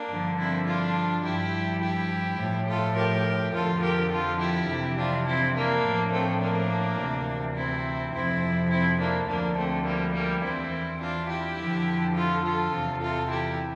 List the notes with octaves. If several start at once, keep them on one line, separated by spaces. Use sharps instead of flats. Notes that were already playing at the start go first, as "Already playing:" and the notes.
Already playing: A#3 D4
G2 D3 F3
C4 E4
D4 F4
G2 F3 E4 G4
E4 G4
A2 F3
F4 A4
G4 A#4
F2 D3 F3 F4 A4
G4 A#4
F4 A4
E4 G4
F2 C3 E3
D4 F4
C4 E4
A#3 D4
A2 F3
A3 C4
A#3 D4
D2 C3 E3
C4 E4
F2 C3 F3 C4 E4
C4 E4
A#3 D4
D2 D3 F3 A#3 D4
A3 C4
G3 A#3
G3 A#3
E2 E3 C4 E4
D4 F4
E4 G4
F2 D3 F3
F4 A4
F4 A4
E2 C3 E3
F4 A4
E4 G4